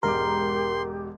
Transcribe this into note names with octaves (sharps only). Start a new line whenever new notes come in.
E1 G#2 G4 A#4 C6 D6